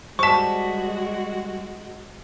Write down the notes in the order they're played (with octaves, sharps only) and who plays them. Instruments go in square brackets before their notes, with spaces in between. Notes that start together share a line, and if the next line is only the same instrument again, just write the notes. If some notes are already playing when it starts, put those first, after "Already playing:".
[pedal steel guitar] G3 [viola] G#3 F#4 [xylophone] C5 A5 [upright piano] C#6 B6